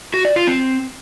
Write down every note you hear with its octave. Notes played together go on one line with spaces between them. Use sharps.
F#4
D5
F4
C4